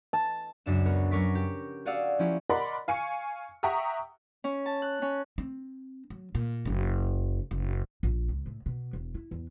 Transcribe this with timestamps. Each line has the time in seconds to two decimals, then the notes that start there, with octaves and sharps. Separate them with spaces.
0.13 A5
0.66 C#2 F#2 D4 E7
0.85 B3 F#4 A#4
1.11 F#3 C#4 A#4 C#6 D6 B6
1.35 G4
1.86 F#4 G#4 D5 F5 F#5 E6
2.19 F3 A#3 C#4 E4 G4
2.50 A#4 D5 D#5 F#5 B5 C6
2.88 F5 G#5 C#6 C#7
3.63 E5 F#5 G5 A#5 C#6 D#6
4.44 C#4
4.66 A5
4.82 F#6
5.02 C#4
5.38 C4
6.10 F#3
6.35 A#2
6.65 F#1 F#3
7.51 F#1
8.03 A#1
8.29 C#2
8.46 A2
8.66 B2
8.93 E1
9.14 E4
9.31 E2